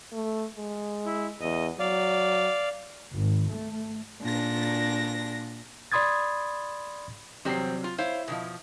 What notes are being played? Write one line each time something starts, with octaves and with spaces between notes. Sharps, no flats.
A3
G#3
E4
E2 D#5
F#3 D5 F5
G#1
A3
A#2 D4 A#6
D5 B5 C6 D#6 G#6 A6
E2 C3 F#3 G3 C4 C7
F4
E4 C5 C#5 F5
B2 E3 F3